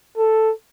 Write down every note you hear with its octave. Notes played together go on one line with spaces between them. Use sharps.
A4